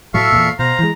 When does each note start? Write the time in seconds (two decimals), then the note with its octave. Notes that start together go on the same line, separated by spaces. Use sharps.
0.14 A2 F#3 A4 E5 F5 C#6
0.32 E2 A#2
0.59 B2 C5 F5 A#5
0.79 E3 G#3